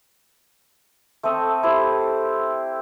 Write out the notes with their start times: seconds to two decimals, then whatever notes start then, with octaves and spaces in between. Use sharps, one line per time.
1.23 A3 C4 A4 D#5
1.63 E4 G4 C5